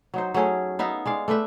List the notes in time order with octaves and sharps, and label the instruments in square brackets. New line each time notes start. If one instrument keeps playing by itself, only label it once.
[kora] F#3 D#4 C5
F#3 A3 C#4 G#4
B3 D#4 E5 F5
G#3 D5 F5
A3 D4 B4 E5